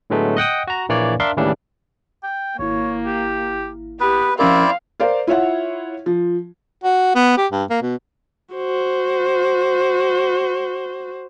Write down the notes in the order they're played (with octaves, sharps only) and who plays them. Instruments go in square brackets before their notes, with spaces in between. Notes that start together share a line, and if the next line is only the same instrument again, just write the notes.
[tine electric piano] A2 D3 F#3 G#3 A3 B3
D#5 F#5 G5 D#6
F#4 A#5
A#1 E3 A#3 C#5 D5
D4 A#4 E5 F5 C6
D#2 A2 C#3 E3 G3 D4
[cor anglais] G5
[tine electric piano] G#1 E4 [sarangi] A#3 [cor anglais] C#5
[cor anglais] G4
[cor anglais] B3 [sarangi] G4 [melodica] B4
[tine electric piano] F3 C#4 A#4 [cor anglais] C4 [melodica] E4 D5 [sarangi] F5
[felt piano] A#4 C5 D5 F5
E4 F4 C#5 E5 F#5
F3
[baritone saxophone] F#4
B3
G4
G2
A#3
B2
[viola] F#4 C5